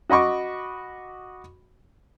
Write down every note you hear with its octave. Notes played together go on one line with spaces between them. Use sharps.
F#4 D#5 B5 C#6 D6